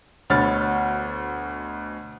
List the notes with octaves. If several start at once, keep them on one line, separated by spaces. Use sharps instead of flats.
D2 B2 C#5 B5 F6 A6